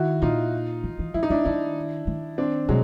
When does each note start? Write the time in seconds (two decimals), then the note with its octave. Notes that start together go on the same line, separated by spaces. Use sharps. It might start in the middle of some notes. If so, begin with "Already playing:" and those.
Already playing: D#3 E4 F#4
0.22 A#2 D#4 F4
0.84 E3
0.99 E3
1.14 F3 E4
1.23 D#4
1.30 E3 D4 E4
1.45 D#3 D4 E4
2.07 D#3
2.38 C4 D4
2.69 B2 F#3 G#3